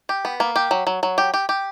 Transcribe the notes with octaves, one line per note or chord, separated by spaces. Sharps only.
G4
B3
A#3
G4
F#3
F#3
F#3
G4
G4
G4